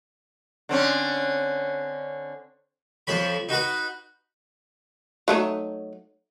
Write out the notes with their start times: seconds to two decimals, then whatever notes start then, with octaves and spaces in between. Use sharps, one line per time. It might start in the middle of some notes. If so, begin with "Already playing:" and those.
0.69 D3 C4 C#4
3.07 F2 F3 C#5 B5
3.49 D#4 F#4 B4 F#5
5.28 F#3 A3 D#4